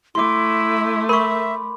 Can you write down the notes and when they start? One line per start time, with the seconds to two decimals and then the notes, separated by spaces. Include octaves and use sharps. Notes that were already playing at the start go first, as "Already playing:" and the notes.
0.15 A3 E4 C6 D6
1.09 A#4 E5 B5 C#6